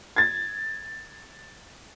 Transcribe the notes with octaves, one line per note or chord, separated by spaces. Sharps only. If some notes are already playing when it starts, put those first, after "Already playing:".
G#6 A6